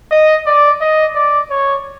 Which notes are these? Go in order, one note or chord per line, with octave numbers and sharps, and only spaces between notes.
D#5
D5
D#5
D5
C#5